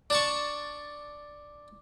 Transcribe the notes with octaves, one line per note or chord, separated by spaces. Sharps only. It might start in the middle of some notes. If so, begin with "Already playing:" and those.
D4 A5 C#6